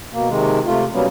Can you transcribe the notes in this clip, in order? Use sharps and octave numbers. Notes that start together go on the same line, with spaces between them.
B2 A#3
C3 D#3 G#3
C3 A3 F4
B2 F#3 G3 A#3 B3 C#4